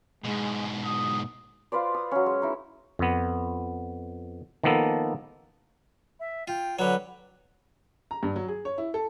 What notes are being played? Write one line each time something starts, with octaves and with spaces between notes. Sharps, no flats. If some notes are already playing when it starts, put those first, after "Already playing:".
G#2 B2 G#3
D#6
F4 B4 C5 D5
D#6
F#3 C#4
G#3
D#4 E4
F2 B3
D#3 F3 A#3 B3 A4
E5
F4 G5
D3 F#3 B4
A#5
G2
F#3
G#4
C#5
E4
A4